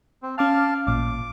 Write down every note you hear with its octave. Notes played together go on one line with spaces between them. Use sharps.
C4
C#4 F5 A5 D6 F6
A1 A#2 D6